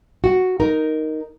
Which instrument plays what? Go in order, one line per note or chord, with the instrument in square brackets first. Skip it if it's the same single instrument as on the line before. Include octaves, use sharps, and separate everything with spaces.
[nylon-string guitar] F#4
D#4 A#4